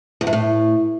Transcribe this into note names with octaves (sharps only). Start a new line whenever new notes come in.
E2
G2
A2